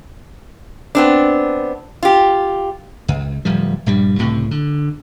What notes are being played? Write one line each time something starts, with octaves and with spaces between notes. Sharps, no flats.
B3 C4 D4
F4 G4
C#2
D1 F3 G3
A#1 G2 G3
C#2 A2 C3
D3